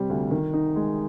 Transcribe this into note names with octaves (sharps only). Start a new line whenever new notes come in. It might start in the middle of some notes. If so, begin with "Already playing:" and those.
Already playing: C3 G3 C4
D2
D#3
D#4
G#3